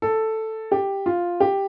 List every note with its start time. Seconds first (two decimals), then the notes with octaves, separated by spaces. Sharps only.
0.02 A4
0.72 G4
1.06 F4
1.40 G4